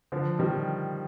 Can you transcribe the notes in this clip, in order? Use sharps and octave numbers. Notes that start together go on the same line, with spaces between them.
D3 F3
D#3 G3